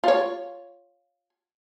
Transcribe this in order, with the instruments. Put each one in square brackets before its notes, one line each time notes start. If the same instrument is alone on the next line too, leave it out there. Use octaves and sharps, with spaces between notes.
[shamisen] F4 C#5